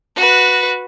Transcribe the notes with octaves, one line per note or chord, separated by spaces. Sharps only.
F#4 B4